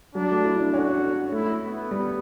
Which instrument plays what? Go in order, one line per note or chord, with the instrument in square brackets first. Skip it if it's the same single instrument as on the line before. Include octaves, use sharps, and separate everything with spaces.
[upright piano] F#3 [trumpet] D4
[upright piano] A3
E4
D4
[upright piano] C#4 [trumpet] F#4
[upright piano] A3 [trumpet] E4
[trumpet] B3
[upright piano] G3